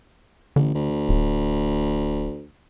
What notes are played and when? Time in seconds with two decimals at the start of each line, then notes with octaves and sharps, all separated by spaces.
0.56 A1 D3
0.75 D2
1.09 D1